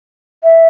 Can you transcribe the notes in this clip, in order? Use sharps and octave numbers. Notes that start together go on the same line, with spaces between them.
E5